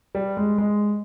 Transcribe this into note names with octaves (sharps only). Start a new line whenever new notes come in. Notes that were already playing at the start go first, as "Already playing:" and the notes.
G3
G#3
G#3